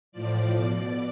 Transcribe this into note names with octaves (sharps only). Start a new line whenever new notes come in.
A2 F3 D5
B2